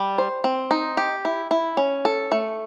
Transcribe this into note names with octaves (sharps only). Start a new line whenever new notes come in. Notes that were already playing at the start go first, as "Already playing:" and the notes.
Already playing: G3
C5
C4
D#4
G4
E4
E4
C#4
A4
A3